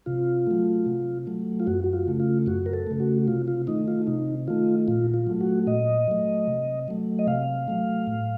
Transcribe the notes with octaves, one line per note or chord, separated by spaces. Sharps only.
C3 F4
F#3 A3
C3
F#3 A3
F4
F#2 F#4
F#4
F4
C#3 A3
F4
F#2 F#4
A#4
A4
C#3 A3
F#4
C3 F4
F4
D#3 A3 D#4
F4
C3 D#4
D#3 A3 F4
A#2 F4
F4
F#3 A3
F#4
A#2 D#5
F#3 A3
C3
F#3 A3
D#5
C3 F5
F#3 A3
A2